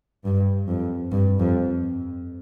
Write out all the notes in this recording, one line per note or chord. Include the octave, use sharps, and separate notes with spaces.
G2
F2
G2
F2